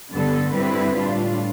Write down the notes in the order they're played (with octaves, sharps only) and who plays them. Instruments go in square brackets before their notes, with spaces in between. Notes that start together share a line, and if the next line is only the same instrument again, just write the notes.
[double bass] G2 [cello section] D3 G3 B3 D4 A4
[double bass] G2 [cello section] D3 G3 C4 E4 B4
[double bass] A2 [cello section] G3 D4 F4